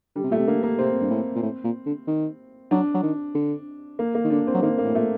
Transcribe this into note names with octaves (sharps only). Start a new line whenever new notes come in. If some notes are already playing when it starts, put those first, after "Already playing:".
D3 G3
C3
A#2 A3
C3
D3 A#3
A#3
C3 C4
G2
A2
A#2
A2
A#2
D3
D#3
F#3 D4
F#3
D#3
D3
A#3
A#3
D#3
D3 D4
C4
F#3
D#3 A#3
A#3
A2
A#2 A3